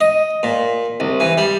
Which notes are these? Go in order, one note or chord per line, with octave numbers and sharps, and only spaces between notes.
D#5
A#2
C2
E3
G3